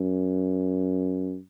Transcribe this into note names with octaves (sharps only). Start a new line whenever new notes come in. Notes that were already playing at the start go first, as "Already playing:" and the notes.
Already playing: F#2